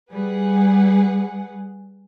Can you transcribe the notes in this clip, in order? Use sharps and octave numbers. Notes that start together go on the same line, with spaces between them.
G3 G#4 B4 F#5